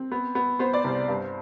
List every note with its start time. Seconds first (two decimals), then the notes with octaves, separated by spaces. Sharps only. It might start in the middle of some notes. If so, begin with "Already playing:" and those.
Already playing: C4
0.12 B3
0.35 B3
0.59 B3 C5
0.73 D5
0.84 C2 C5
1.08 G2